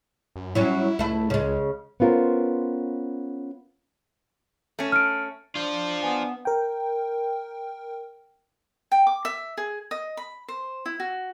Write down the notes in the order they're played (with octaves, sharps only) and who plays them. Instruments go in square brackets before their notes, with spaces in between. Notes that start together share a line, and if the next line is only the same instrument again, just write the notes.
[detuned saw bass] F#2
[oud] F#3 G3 C#4 [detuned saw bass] E4
[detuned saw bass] C#2 [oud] A3 E4
[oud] C#3 G#3
[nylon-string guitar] B3 C#4 F4 A#4 C5
[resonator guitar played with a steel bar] A3 C#4
[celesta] F6 D7
[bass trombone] D4 [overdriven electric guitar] F4 C5
[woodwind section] B3 [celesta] G#5
[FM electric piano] A#4 G5
[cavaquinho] G5
D6
E5
G#4
D#5
B5
C5
E4
F#4